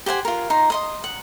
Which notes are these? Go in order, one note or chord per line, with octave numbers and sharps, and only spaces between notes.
G4 C5 F#5 G#5
F4 A#4
D#4 A#5 C6
D#5 C6 D#6
F#5